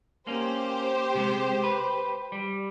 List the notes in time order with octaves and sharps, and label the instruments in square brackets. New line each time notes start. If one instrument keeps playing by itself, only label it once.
[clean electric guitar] A#3 C#4 [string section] G4 C5
[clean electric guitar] C3 G#3
B4
G3